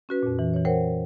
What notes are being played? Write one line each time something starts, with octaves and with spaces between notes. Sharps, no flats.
C#4 F#4 B4
F2 A#2
E3
E3 C#5
A#4 C5 C#5 F#5 G5